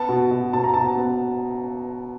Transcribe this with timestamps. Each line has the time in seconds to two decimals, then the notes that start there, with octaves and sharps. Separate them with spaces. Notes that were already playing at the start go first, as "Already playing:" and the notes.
Already playing: B3 A5
0.09 B2
0.31 B2
0.53 B2 A5
0.64 A#5
0.74 B2 A5
0.97 B3